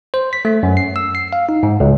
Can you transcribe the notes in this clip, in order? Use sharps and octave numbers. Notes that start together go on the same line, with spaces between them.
C5
B6
A3
F#2
C7
E6
C7
F5
D#4
G#2
C#2